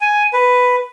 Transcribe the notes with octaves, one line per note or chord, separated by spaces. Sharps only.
G#5
B4